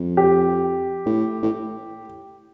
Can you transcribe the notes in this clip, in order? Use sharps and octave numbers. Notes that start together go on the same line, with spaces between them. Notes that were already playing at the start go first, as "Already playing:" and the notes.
Already playing: F2
G4
A2
A2